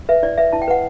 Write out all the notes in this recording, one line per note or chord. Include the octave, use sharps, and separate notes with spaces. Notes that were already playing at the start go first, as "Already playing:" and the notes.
B4 E5
E4 D5
B4 E5
E4 A5
G5
B4 F#5